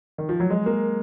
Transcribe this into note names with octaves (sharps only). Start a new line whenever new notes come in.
D#3
F3
F#3
G#3
A#3